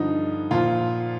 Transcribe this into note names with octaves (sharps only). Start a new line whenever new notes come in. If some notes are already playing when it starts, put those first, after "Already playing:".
Already playing: G2 D3 F3 D#4
A#2 F3 F4